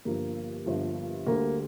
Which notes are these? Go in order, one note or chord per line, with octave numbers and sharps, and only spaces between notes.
G1 G2 F3 A#3
G1 G2 F3
D2 D3 G3 A#3